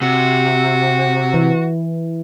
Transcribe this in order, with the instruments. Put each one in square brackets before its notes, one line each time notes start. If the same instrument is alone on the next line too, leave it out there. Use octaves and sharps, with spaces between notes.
[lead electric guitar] C3 [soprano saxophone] F#4
[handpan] E3